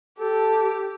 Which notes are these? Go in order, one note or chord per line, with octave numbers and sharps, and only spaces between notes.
G4 A4